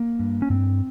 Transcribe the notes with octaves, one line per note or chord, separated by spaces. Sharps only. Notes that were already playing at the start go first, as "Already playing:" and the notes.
Already playing: A#3
G2
C#4
G2 C4